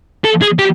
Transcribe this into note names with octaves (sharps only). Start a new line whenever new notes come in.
A4
G#4
G4